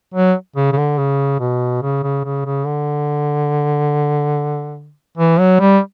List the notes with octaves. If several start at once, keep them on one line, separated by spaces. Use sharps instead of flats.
F#3
C#3
C#3
D3
C#3
B2
C#3
C#3
C#3
C#3
D3
E3
F#3
G3